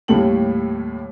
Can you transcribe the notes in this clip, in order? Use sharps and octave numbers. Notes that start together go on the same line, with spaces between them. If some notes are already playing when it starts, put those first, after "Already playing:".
D#2 A2 G3 A4 G5 F#7